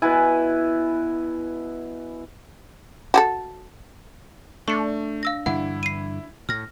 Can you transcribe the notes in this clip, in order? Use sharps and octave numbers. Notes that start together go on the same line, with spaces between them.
B2 E4 B4 G#5
F#4 G4 A4
A3 D4 C#6 C#7
F5 E6 A#6
G2 D3 E3 E4 F#5
C7 D#7
A2 F6 A#6